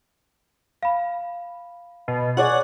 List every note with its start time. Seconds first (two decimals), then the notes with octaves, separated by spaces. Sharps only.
0.83 F5 B5
2.08 B2
2.37 G#4 C#5 D5 F#5